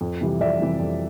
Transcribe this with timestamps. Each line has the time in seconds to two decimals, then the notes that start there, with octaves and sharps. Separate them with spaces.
0.01 F2
0.21 C3 E3 G3
0.41 F2 D5 E5
0.60 C3 E3 G3
0.80 F2